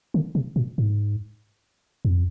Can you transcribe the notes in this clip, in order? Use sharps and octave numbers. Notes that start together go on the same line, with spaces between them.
D3
C3
A#2
G#2
F2